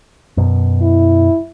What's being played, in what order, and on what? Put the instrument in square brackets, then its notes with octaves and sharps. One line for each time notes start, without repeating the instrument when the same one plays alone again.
[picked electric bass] F#2 B2
[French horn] E4